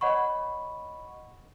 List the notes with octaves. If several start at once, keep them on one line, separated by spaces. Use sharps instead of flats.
C#5 D#5 F#5 B5 C#6